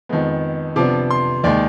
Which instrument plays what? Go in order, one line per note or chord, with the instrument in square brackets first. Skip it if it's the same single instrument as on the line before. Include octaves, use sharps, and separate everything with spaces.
[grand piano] F2 D#3 G#3 B3
C3 F3 B3 D4 D6
C6
D#2 D#3 G#3 D5